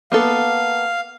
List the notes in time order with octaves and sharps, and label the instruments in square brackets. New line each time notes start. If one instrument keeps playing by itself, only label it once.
[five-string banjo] A#3 B3 A4 [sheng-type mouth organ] F5